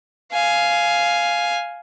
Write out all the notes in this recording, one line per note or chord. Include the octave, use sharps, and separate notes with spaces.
F5 G#5